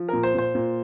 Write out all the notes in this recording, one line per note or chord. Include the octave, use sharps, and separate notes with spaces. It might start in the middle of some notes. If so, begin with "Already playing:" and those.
Already playing: F3
A#2 A#4
C5
A#2 C5
A#2